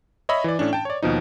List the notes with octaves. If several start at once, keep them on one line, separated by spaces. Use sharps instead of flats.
C#5 D#5 E5 B5
E3 D5
A2 C#4 D4
G5 A5
C#5 D5
D#2 B2 F3 D#4